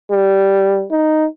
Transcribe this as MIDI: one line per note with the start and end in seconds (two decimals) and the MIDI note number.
0.12 0.86 55
0.91 1.27 63